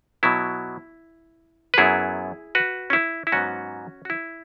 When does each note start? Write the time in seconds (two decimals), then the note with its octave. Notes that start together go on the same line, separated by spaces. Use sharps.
0.23 B2 F#3 B3 E4
1.74 B4
1.78 F#2 F#3 B3 E4 G#4
2.55 F#4 B4
2.90 C#4
2.93 E4
3.27 E4
3.32 G#2 F#3 B3 C#4 F#4
4.05 F#4
4.10 E4